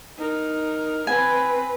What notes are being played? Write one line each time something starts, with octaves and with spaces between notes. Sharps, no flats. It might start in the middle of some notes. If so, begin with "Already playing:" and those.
D#4 A#4
C4 B4 G#5